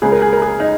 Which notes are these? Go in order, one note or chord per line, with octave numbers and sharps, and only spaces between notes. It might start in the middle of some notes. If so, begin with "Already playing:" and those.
C#2 C#3 G#4
A#4
G#4
A#4
G#4
D#4